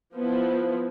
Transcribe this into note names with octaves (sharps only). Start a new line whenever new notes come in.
F3 B3 E4